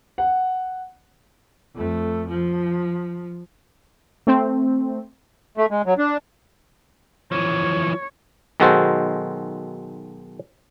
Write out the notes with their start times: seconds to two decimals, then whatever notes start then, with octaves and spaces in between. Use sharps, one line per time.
0.18 F#5
1.74 F2 A3
2.28 F3
4.27 A3 C4
5.58 A3
5.71 G#3
5.86 F#3
5.98 D4
7.32 E3 F3 C#5
8.60 B1 D#3 G#3 F#4 A4 C5